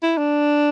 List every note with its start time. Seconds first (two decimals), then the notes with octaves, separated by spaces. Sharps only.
0.03 E4
0.18 D4